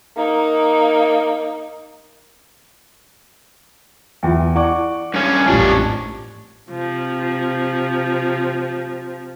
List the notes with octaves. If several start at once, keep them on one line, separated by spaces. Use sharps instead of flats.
A#3 D#4
E2 F4 E5 G5
E4 D5 F#5 C#6 D6
G2 C#4
A1 F2 G#2 F3 G3 D4 C#5
C3 F3